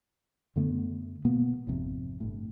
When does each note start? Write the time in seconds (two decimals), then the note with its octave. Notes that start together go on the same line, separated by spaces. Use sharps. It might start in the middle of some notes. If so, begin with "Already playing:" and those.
0.56 F#2 D3 A3 B3
1.25 B2 A#3 B3
1.67 G#1 F2 C3
2.20 G1 A2